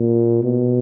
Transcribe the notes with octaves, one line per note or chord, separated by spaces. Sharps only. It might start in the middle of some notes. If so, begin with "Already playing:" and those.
Already playing: A#2
B2